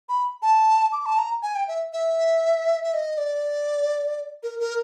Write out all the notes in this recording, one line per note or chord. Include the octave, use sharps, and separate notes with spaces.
B5
A5
D6
A5
A#5
G#5
G5
E5
E5
E5
D#5
D5
A#4
A#4